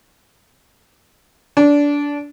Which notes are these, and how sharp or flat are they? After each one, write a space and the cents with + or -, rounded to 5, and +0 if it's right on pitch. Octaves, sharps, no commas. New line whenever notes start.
D4 -20